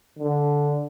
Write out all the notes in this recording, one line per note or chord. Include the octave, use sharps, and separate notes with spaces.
D3